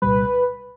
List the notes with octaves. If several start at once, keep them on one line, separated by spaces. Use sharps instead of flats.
C2 A#2 G3 B4